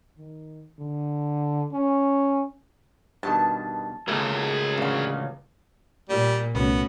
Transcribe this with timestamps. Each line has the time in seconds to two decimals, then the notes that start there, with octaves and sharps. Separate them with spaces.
0.18 D#3
0.79 D3
1.72 C#4
3.23 G2 B2 D#3 A5
4.08 C#2 A3 A#3 G#4 A#4
4.78 A1 D2 A#3 C#4 F5
6.09 A#2 G3
6.55 C2 A3 B3 C#4 F#4